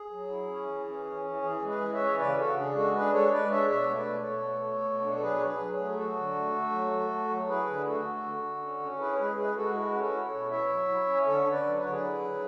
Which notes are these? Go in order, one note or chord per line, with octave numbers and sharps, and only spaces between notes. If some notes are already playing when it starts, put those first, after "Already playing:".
Already playing: G#4
F#3
E4
C#4
E3
C#4
C#4
E3
E3 G#4
G#3
G#4 B4
E3
C#5 E5
C#4
C#3 B4 D5
C#3 F#4 A4
D4 G#4
G#3 F#4 A4
D4 G#4 B4
G#3 A4 C#5
G#3 B4 D5
D4 C#5 E5
B2 C#5 E5
A3
B4 D5
B2
A4 C#5
B2
A3
A3
B2
D4
A4
F#3 G#4 B4
F#3 C#5
G#4 B4
F#3
G#4
A3
F#3 F#4 A4
D3
A3
A3
F#3
A3
A3
F#3
E4 G#4 B4
D3
A3 F#4 A4
A3
D3
D3
C#4
C#4
E4 G#4 B4
C#5
G#3 G#4 B4
G#3 G#4 B4
G#3 F#4 A4
E4 F#4
C#4 B4
F#4 A4
E4
A4 C#5
B2
E4 C#5 E5
F#3
E4
C#4
D3 A4 C#5
D3
B4 D5
F#3
B4
D3 C#5
G#4 B4
E4
F#3